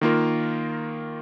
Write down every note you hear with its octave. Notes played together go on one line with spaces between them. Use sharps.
D#3 A#3 F4 A#4